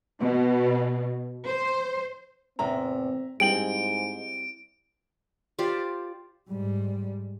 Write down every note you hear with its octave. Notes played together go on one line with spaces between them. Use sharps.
B2
C5
E2 A2 C3 C4 E5 A#5
G#2 G3 C4 E4 G#4 G5 D7 F#7
F4 G4 C5 D5
G#2 G3